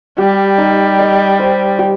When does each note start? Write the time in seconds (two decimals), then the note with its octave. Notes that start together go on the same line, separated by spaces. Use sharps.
0.18 G3 G4
0.58 D#4
0.99 D#5
1.39 C5
1.79 G4